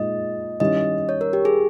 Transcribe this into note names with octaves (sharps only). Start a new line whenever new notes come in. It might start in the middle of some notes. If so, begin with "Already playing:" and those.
Already playing: A#2 G#3 D#4 G#4 D#5
D#3 G3 C#4 E4 D#5
C#5
A#4
G4
G#4